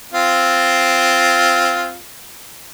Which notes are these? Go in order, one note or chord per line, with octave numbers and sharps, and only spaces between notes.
C4 F4